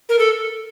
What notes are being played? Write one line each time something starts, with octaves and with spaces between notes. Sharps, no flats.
A#4
A4